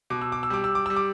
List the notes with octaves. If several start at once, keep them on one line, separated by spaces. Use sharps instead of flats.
B2 D6
E6
D6
E6
G3 D6
E6
D6
G3 E6
D6